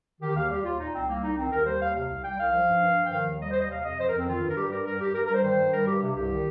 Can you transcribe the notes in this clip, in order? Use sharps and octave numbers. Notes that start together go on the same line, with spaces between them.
D#3 G4
D#2 F5
G3 G4
D#2 F4
A#2 D#4
C2 C4
G3 A#3
C2 D#4
D#3 C4
D#2 A#4
G3 C5
D#2 F5
C3 F5
C2
G3 G5
C2 F5
F3
G2
G2
F3
G5
D#3 F5
D#2
G3 D#5
D#2 C5
D#5
C3 F5
F2 D#5
F3 C5
A#4
F2
C4
D#3 F4
G2
A#4
G3 G4
G2 A#4
G3 A#4
G2 G4
G2 A#4
A#4
G3 C5
D#3 C5
G2
G3 A#4
G2 G4
C3
C2 G4
D#3